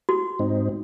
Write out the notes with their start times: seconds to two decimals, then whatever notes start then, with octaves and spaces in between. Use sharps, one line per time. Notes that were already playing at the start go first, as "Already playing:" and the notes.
0.09 F#4
0.39 G#2 C4 D#4